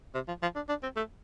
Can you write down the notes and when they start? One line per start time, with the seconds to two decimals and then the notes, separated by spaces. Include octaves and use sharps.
0.14 C3
0.28 F3
0.42 F3
0.55 D4
0.69 D4
0.83 C4
0.96 A3